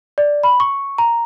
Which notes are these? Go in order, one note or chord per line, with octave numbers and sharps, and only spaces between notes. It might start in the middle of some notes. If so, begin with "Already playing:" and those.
D5
B5
C#6
A#5